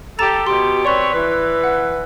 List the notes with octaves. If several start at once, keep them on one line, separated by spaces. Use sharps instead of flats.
G4 A4 A#5 A6 E7
B2 G4 C6
C4 B4 C#5 D5 C6 C#6
E3 B4
F#5